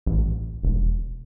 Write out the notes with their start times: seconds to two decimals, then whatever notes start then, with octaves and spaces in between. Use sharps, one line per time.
0.06 A1
0.63 E1